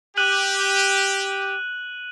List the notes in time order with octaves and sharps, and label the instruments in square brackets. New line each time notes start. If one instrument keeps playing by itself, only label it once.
[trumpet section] G4 [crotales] F#6 D#7 F#7